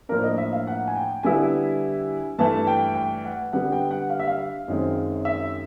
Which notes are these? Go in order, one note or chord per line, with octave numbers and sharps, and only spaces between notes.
A2 F3 A#3 D4 A#4
D#5
E5
F5
F#5
G#5
G5
D3 G3 B3 E4 G#5
G2 E3 A3 A5
G5
G5
F#5
D3 G3 B3 F#5
G5
F#5
F5
E5
F5
F#2 D#3 G#3 C4
E5